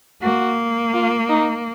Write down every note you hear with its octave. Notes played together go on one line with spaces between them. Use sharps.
A#3 F#4
F4
D#4